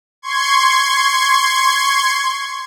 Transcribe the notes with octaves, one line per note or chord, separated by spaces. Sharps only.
C6 C#6 G#6